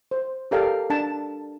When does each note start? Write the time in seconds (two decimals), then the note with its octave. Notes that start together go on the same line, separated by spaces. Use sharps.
0.11 C5
0.51 G4 A4 A#4 D5 F5 G5
0.90 D4 A5